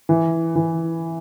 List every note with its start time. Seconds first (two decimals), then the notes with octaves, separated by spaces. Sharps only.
0.09 E3
0.56 E3